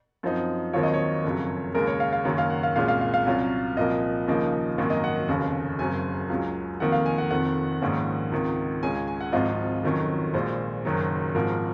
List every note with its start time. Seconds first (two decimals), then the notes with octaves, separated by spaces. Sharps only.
0.23 F#2 F3 C4 D#4
0.73 D#2 D#3 F#3 C4 F4 C#5
0.83 D#5
0.94 C#5
1.24 F#1 F2 C#3 F#3
1.74 D#2 C#3 G#3 A#4
1.87 C#5
2.00 F5
2.13 F5
2.25 F#1 F#2 D#3 F#3 A#3
2.38 F5
2.50 F#5
2.63 F5
2.76 C2 A#2 G#3 C#4 F4 F5
2.88 F5
3.01 F5
3.14 F5
3.26 C2 C3 F#3 C#4 F4
3.77 C2 A#2 F3 A#3 D#5
4.28 D#2 C#3 F3 A#3 D#4
4.78 G#1 F#2 D#3 F#3 A#3
4.90 D#5
5.04 F#5
5.28 F1 D#2 C#3
5.79 F#1 F#2 C#3 F#3 C4 G#5
6.29 C#2 C#3 F#3
6.80 F1 F2 D#3 A#3 F#5
6.92 F5
7.06 G#5
7.18 F#5
7.31 F1 F2 D#3 F#5
7.82 A#1 G#2 D#3 A#3 C#4
8.32 C#2 C3 D#3
8.83 C#2 C#3 G#3 C#4 G#5
8.95 G#5
9.07 G#5
9.21 F#5
9.33 G#1 G#2 F3 C4 F4 D#5
9.83 F1 F2 D#3 F#3 C#4
10.34 A#1 A#2 G#3 C5
10.85 F#1 F#2 D#3 F#3
11.35 G#1 G#2 F3 A#4